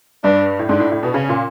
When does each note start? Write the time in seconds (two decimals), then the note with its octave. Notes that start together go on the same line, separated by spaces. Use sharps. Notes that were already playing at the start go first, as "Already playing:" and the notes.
0.24 G2 D4
0.59 A2
0.69 G#2 D4
0.80 A2
0.91 A2
1.03 B2
1.14 C#3 C#4
1.29 A#2